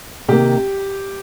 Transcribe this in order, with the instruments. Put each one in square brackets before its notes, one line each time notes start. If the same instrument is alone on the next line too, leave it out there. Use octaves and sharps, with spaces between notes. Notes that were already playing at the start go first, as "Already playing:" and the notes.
[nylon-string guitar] C3 D#3 A#3 [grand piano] G4